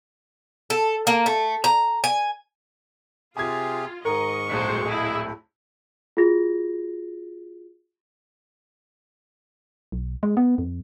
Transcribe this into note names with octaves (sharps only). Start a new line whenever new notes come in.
A4
A#3
A3
A#5
G#5
C3 F4 G4 G#4 G#5 G#6
G#2 D#3 A#4 D#5 C#6
D1 A#1 G#3 F#4 C5 B6
E4 G#4 D#5 F#6
F4 F#4 G#4 A#6
B1
G#3
B3
F2